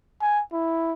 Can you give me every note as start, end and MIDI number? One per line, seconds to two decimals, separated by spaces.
0.22 0.42 80
0.53 0.93 64